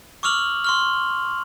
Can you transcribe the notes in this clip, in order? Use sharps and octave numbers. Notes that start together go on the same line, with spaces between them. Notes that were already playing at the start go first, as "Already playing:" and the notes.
C#6 D6 E6 F6 F7 F#7
C6 C#6 F6